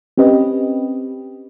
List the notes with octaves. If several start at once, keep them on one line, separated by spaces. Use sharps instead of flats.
C4 C#4 G4 B4 D#5